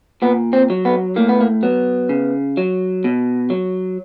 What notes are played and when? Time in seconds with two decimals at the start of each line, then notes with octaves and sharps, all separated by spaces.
0.22 A#2 B3
0.53 C4
0.70 F#3
0.85 B3
1.16 A2 A#3
1.29 B3
1.40 A#3
1.63 F#3 B3
2.09 C#3
2.57 F#3
3.04 B2
3.50 F#3